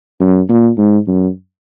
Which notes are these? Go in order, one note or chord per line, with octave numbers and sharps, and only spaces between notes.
F#2
A#2
G#2
F#2